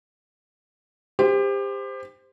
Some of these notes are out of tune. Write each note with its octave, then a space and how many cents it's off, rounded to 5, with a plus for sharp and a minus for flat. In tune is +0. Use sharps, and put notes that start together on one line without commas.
G4 +30 C5 -10